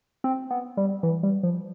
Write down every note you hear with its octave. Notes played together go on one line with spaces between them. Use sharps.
C4
B3
G3
E3
G3
F3